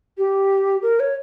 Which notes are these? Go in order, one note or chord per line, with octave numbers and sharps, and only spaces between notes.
G4
A#4
C#5